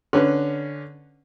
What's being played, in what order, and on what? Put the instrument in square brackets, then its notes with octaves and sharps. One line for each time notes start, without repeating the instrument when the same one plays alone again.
[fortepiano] D3 C#4 B4